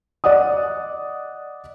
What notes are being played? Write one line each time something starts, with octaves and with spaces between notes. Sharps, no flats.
D5 D#5 F#5 D#6